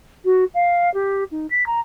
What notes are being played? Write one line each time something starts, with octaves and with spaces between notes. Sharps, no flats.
F#4
F5
G4
D#4
B6
A#5